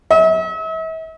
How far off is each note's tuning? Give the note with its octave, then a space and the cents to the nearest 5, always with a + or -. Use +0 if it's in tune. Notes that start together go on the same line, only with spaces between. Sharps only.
E5 -40